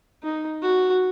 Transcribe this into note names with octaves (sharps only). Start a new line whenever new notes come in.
D#4
F#4